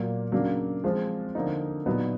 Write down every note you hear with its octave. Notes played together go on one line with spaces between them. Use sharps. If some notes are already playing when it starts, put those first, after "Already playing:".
Already playing: A#2 F#3 A#3
C#3 F#3 A#3 D4
F3 G#3 C4 F4
D3 F3 A#3 D#4
A#2 F#3 B3 D#4